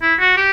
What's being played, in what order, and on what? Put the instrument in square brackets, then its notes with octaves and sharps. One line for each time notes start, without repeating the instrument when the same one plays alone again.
[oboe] E4
F#4
G4